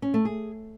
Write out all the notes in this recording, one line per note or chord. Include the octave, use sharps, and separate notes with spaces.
C#4
A3
G#4